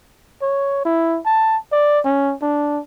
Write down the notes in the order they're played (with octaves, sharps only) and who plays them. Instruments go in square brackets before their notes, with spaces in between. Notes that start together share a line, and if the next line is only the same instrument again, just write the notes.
[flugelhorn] C#5
E4
A5
D5
C#4
D4